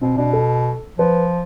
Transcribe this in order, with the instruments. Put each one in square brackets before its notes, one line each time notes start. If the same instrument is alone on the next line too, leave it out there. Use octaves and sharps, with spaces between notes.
[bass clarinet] B2 [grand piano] C4
[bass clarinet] B2 [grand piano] D4
[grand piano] A4
[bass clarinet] F3 [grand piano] B4